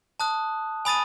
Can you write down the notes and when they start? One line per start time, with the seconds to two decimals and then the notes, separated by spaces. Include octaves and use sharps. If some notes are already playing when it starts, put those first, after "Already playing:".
0.20 A5 D#6 F#6
0.85 G#5 B5 D#6 A6 D#7